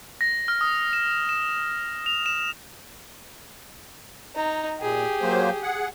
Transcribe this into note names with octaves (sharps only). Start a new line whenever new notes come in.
A#6
F6
D#6
E7
E7
F7
E7
D#4 A#5
A#2 G4 G#4
F#3 A#3 C5
G#4 F#5